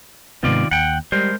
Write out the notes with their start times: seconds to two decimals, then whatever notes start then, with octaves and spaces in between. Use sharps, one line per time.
0.43 G#2 C3 D#3 B3 F4 D5
0.71 D#2 F#5 G5
1.12 G3 G#3 A#4 C5